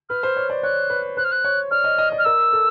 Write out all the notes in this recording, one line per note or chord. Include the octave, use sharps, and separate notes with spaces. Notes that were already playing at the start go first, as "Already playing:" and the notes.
B4 F6
C5
C#5
D5
C#5 F#6
B4
C5 F#6
F6
F#6
C#5
D5 F6
D#5
D#5
D5
F6
A#4 E6
A4